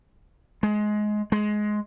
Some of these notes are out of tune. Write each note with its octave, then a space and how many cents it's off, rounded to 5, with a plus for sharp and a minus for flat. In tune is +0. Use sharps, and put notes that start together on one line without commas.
G#3 +20
G#3 +15